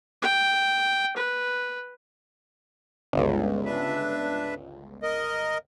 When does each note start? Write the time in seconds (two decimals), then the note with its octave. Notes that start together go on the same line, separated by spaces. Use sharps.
0.22 G5
1.16 B4
3.13 G1 C#2
3.65 D4 B4 E5
5.03 A#4 D#5